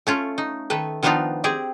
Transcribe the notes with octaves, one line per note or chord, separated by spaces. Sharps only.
A3 C#4 F4
D#4
D#3 A3 B4
D#3 F3 B3 D4 D#4 F4
C4 G4 G#4 D5